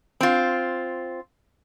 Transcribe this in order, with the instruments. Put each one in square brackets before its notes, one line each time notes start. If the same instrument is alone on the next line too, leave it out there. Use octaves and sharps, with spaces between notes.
[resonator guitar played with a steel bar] C4 F4